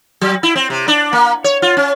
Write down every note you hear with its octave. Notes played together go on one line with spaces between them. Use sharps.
F#3
E4
C4
C3
D4
A#3
C#5
F4
C#4